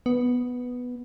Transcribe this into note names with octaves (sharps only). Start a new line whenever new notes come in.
B3